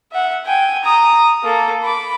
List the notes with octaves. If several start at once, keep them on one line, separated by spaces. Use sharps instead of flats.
E5 F#5
G5 G#5
A#5 D#6
A#3 A4
B5 D6